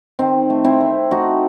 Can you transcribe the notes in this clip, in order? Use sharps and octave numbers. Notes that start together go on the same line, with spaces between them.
D#3 C4
A3
C4 E4
A3
A3 D#4 F#4